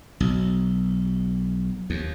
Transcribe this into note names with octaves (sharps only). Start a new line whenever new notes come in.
B1
D#2